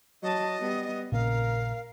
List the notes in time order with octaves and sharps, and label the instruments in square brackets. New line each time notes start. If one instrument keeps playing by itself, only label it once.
[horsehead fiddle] F#3 A5 [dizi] D#5
[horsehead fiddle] G3 B3
[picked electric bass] A#1 A#2 C#3 [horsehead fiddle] A#4 [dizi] F5